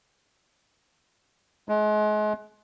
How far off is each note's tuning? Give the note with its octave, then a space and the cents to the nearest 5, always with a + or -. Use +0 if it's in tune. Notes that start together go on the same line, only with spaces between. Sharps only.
G#3 +35